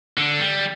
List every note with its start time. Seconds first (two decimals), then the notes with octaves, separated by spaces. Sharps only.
0.18 D3
0.40 G3